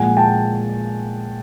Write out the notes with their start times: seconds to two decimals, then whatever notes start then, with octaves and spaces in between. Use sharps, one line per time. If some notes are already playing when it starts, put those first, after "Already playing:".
Already playing: A#2 F3 G#3 F#5 G#5
0.17 G5 A5